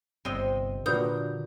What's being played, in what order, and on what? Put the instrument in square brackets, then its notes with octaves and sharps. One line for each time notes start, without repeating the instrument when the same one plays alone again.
[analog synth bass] G1 [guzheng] C3 D#5 C6
[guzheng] A#2 [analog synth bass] D3 [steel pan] F#4 B4 [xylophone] D#6 G6